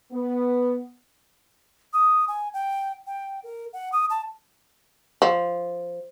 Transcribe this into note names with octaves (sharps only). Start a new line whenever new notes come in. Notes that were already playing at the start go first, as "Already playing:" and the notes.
B3
D#6
G#5
G5
G5
A#4
F#5
D#6
A5
F3